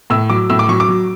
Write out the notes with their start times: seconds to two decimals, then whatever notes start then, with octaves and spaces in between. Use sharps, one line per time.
0.10 A2 E6
0.30 F#3 D6
0.50 A2 E6
0.59 D6
0.68 F#3 C#6
0.80 D6
0.88 F#3